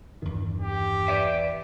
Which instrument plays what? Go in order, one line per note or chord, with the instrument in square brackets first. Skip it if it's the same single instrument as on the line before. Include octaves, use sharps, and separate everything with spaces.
[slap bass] E2 D#3 [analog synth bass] G2
[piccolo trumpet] G4
[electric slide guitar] B4 D5 E5